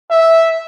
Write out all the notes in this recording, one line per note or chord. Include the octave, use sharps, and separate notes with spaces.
E5